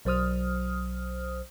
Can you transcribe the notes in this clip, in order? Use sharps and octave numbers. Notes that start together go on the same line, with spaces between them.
B1 F#3 C5 D#6 F6